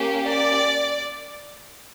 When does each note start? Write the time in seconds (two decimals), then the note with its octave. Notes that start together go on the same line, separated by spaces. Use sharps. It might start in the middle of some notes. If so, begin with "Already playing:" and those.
Already playing: A#3 C#4 G4
0.26 D5